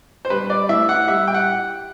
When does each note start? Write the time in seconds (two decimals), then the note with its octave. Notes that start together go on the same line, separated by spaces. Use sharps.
0.25 C5
0.30 G3 B4
0.50 D5
0.69 A2 E5
0.89 F#5
1.08 G3 E5
1.27 G5
1.34 F#5